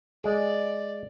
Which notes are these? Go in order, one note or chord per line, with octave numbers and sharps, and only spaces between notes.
G#3 G#4 D5